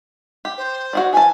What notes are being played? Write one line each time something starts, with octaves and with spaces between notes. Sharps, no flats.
G4
C5
F#4 G#4 D5
E3 G#5 A5